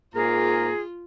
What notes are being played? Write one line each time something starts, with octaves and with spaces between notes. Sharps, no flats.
G#2 A#3 F4 G#4 A#5